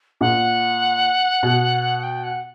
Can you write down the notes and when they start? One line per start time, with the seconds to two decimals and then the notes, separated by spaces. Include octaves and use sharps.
0.21 A#2 F#5
1.43 B2
1.99 F#5
2.03 G5
2.23 F#5